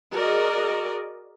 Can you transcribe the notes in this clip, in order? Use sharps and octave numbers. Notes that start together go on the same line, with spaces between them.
F#4 G#4 A#4 D5 D#5